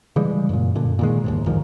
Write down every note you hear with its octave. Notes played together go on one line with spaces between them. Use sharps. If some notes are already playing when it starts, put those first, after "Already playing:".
C#3 E3 G3 G#3
F#2 A#2
F#2 A#2 D3
A#2 D#3 G#3
F#1 D#2 G#2
D2 G#2 D#3 F3